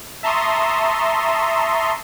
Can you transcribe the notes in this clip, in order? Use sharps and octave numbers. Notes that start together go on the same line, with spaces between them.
E5 A5 A#5 C6 C#6 D#6